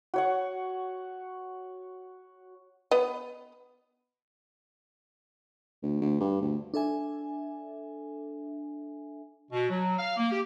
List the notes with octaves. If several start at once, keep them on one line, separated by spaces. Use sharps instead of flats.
F#4 C#5 F#5
B3 D#5
D2
D2
G2
D2
D4 A4 E5 G#5
B2
F#3
F5
A#3
G4